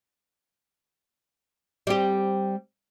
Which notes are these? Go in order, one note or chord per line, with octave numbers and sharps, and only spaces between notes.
G3 C4 G4